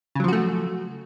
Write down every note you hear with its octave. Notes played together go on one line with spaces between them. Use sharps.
C#3 F3 F#3 A3 F#4